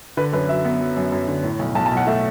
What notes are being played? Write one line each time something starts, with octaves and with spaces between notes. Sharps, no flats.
D3 B4
F#2 B4
F#3 E5
B3
F#3
F#2
F#2
D3
A2
B1
B1 A5
A5
B1
F#5
A3 E5